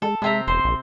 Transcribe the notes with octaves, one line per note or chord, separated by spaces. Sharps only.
G#3 A4
C3 G#3 C4 E5 A#5
E1 C5 C6
A#1